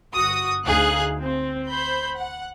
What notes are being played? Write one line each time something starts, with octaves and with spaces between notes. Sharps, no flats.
G1 F#4 D#6
D2 D#4 G#4 F5 F#6
C4
C5 B5 G6
F#5